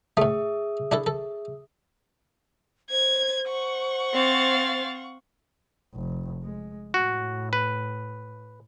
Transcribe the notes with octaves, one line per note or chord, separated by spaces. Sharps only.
A2 A3 G#4 E5 D#6
D4 E4 A4
A4
C5 G#6
F#5 C#6
C4 F5 A6
F1
G#3
A2 F#4
B4